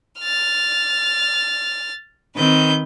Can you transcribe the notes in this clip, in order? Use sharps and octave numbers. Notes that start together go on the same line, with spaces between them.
F6 A6
D#3 C4 B4 G6